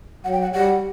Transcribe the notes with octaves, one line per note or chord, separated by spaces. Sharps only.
F#3 F#5
G5
F#5
G3 F#5